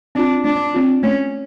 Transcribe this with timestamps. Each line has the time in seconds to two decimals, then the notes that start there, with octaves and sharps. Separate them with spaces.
0.15 C4 D4 F4
0.44 A3 D4
0.74 C4 F4
1.03 A3 C#4